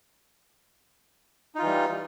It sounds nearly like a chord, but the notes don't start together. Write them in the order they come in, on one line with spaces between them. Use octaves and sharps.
D#4 F4 E3 G3